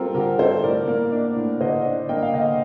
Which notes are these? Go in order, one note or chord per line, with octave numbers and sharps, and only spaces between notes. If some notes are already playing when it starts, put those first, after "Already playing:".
Already playing: G3 C4 F4 G4 A4 A#4
D3 G4 A#4
C4 A4 C5
A2 A#4 D5
A#3
D4
A2
D3 C5 D#5
D4
A#3 D#5 G5
F5
D3 D#5 G5